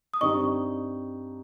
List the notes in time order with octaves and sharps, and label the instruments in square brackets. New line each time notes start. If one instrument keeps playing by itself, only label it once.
[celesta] D#6
[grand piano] G2 G3 C4 D#4 [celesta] C#6